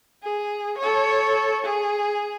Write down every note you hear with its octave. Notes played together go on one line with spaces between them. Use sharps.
G#4
A4 C#5
G#4